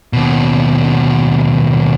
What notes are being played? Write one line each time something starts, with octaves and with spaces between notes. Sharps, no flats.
D#2 B2